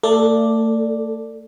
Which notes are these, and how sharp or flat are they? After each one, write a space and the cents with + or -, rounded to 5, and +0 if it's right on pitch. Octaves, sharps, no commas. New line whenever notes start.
A3 +40 A4 +0 D5 +0